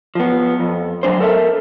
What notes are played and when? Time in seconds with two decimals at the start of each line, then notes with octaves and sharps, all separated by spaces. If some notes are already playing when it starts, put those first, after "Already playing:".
0.15 F3 B3
0.60 F2
1.03 D2 F#3 G#3 D4 C5
1.20 A4 A#4 C#5 E5